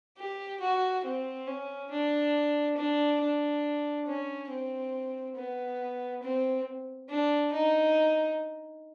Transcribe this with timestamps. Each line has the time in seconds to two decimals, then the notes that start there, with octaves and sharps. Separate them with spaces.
0.18 G4
0.60 F#4
1.05 C4
1.47 C#4
1.90 D4
2.77 D4
3.21 D4
4.06 C#4
4.50 C4
5.36 B3
6.23 C4
7.09 D4
7.53 D#4